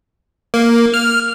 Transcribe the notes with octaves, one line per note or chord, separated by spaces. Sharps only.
A#3
F6